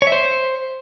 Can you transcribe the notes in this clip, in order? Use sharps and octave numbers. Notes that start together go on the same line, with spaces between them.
C#5
E5
C5